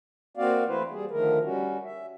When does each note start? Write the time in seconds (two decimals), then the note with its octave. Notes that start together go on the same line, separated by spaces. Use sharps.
0.37 A#3 C4 F#4 D5 F5
0.67 E3 A3 E4 B4 C5
0.91 G3 G#4
1.11 D3 D#3 F3 A3 A#4
1.43 G3 C#4 F#4
1.84 E5